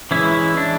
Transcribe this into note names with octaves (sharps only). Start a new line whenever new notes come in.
E3 G#3 C#4 E4
D4